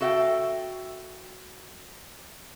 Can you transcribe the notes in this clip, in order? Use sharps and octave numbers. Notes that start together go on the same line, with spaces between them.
F#4 A4 E5 F5 G5